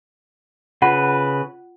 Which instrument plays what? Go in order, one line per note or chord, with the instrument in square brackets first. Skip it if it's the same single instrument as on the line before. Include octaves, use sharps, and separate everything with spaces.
[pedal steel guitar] C#3 B4 [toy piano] F4 F#5